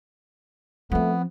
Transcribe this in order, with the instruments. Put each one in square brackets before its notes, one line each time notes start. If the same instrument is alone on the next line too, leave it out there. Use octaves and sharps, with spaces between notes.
[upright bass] F3 C4 [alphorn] A3 [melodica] B3